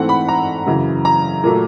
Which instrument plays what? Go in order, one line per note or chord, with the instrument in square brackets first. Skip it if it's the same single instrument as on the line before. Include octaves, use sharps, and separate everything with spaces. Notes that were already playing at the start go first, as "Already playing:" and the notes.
Already playing: [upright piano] G#2 E3 A3 C4 F#5
B5
A#5
F#2 C#3 E3
A#5
A#2 F#3 A3